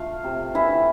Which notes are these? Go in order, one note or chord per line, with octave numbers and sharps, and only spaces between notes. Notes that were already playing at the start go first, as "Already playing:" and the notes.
Already playing: A3 F4 F5
C3
E3 E4 E5